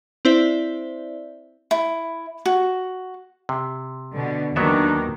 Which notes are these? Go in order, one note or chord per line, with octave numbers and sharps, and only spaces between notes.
C4 E4 C5 D5 E5
E4
F#4
C3
B2 D3
D#2 D#3 F#3 B3 D4 E5